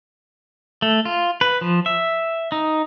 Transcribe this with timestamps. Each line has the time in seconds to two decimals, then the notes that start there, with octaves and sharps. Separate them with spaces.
0.82 A3
1.05 F4
1.41 B4
1.61 F3
1.86 E5
2.52 D#4